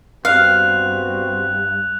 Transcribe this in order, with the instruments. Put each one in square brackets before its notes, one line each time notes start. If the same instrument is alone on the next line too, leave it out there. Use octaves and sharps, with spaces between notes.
[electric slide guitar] G2 [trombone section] B3 C4 F#4 [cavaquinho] F5 [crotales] F#6 F7